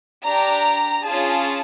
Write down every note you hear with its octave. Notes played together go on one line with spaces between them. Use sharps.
D4 G4 A#5
C#4 F4 G#4 A5